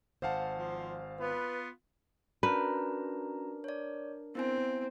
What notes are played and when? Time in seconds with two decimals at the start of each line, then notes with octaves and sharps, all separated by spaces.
0.22 G#1 C5 F5 F#5 A5
0.56 F3
1.19 B3 F4 B4
2.43 C#4 D4 F#4 A#4 B4 A#5
3.64 C#5 D5
4.35 B3 C4 E4 G#5